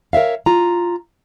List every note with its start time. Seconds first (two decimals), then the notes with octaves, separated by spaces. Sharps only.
0.13 A#4 C#5 E5 F5
0.46 F4 A#5